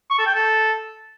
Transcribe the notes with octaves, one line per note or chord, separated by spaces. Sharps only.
C#6
A4
G5
A4